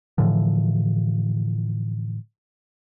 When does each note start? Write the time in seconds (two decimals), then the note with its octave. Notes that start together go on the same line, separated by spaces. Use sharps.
0.18 A2 D3 E3 F3